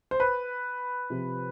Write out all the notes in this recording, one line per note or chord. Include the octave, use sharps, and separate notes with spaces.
C5
B4
C3 F3 C4